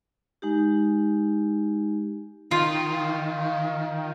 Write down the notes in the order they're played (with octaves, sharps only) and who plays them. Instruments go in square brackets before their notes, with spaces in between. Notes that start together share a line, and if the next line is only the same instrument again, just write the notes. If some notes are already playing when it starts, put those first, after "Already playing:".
[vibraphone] G#3 D#4 G4
[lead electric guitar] D#3 [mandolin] F4